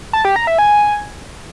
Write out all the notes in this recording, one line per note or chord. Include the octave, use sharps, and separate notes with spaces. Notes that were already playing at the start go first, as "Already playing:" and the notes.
A5
G4
A#5
E5
G#5